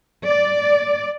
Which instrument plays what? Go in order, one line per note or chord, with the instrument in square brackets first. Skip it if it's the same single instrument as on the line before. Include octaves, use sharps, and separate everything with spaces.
[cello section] D5